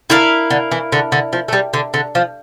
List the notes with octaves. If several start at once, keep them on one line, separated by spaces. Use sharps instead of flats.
D3 E4 A#4 F5
D3
E3
D3
D3
F3
A3
G3
D3
D3
F3